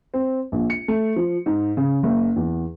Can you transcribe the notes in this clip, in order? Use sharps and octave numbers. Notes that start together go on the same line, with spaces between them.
C4
A#1
C#7
A3
F3
G#2
C#3
F#1
E2